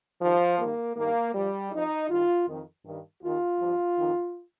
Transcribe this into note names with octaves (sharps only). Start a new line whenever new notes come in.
G2 D#3 F3
G2 D#3 A#3
G2 D#3 A#3
G2 F3 G3
F2 F3 D#4
G2 D#3 F4
F2 D#3
G2 D#3
D#2 D#3 F4
G2 F3
F2 D#3